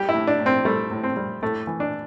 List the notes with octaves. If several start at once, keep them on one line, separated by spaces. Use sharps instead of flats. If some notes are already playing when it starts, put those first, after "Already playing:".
Already playing: G3 G4
E4
A2
D4
A2
C4
G3 A3
A2
C4
G3
A2 A3
E3
D4